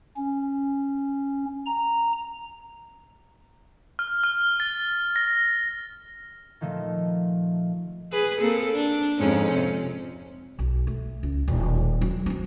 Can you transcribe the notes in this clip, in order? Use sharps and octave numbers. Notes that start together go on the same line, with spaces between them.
C#4
A#5
F6
F6
A6
A#6
A#2 D#3 F3 A3
G#4 B4
A#3 C4 A4
D4
F2 G#2 C#4
C3
B1
A3
C#2
D#1
F#3
B3 C4